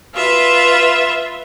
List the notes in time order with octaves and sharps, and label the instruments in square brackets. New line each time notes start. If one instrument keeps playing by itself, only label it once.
[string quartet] F4 B4 E5